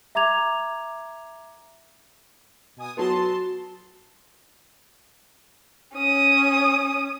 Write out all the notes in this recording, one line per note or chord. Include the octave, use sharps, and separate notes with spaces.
E5 A#5 D6 G#6 F7
B2 G#5 D#6
F#3 B3 F#4 A5 C6
C#4 D#6